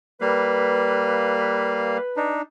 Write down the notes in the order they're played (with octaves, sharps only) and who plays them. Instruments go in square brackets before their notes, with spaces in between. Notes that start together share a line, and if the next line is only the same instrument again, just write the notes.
[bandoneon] G3 A#3 F5 [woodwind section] B4
[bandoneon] D4 D#4